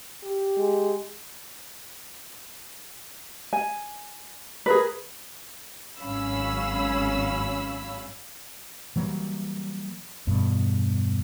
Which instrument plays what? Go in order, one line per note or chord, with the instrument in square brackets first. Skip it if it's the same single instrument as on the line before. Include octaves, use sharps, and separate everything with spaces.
[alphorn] G4
[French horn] G#3
[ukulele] G#5
G#4 A#4 B4
[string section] G#1 F#3 C#4 F5 B5 E6
[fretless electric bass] E3 F#3 G3 A#3
E2 G2 B2